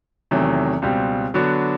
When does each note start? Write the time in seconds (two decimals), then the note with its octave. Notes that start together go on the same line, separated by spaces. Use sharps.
0.31 E2 C3 D#3 F#3 A3
0.82 C#2 B2 G3 C4
1.34 D3 F#3 B3 D4 F#4